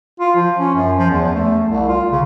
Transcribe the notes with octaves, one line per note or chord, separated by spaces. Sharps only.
F4
F3
C#4
F#2
F3
E2
A3
C2
F4
C#3